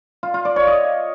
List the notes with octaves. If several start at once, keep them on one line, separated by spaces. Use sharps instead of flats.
F4
F4
D5
C#5
D#5